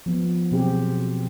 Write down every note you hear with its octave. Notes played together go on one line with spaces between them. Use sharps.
F3 B3
B2 F#3 C4 G4 G#4